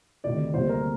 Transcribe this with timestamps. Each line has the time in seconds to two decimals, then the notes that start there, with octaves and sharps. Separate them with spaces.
0.24 D2 C3 D#3 D5
0.54 D2 C3 G3 A#3 C5
0.69 A#4